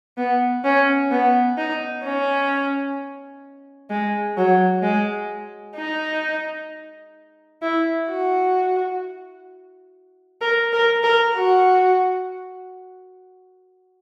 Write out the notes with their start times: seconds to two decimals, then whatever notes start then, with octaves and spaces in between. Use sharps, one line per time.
0.17 B3
0.64 C#4
1.11 B3
1.58 D#4
2.04 C#4
3.90 G#3
4.37 F#3
4.83 G#3
5.76 D#4
7.62 E4
8.08 F#4
10.41 A#4
10.73 A#4
11.03 A#4
11.35 F#4